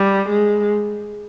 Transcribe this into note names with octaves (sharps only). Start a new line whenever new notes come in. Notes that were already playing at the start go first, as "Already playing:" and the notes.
Already playing: G3
G#3